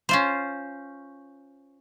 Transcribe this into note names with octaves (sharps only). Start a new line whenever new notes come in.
C#4 F4 C5